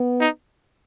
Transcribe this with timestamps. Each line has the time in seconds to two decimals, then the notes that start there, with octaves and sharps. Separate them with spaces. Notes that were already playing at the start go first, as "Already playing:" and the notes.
Already playing: B3
0.20 D#4